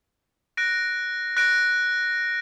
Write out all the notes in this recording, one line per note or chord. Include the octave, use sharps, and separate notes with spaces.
F#6 A#6 D7
F#6 A#6 D7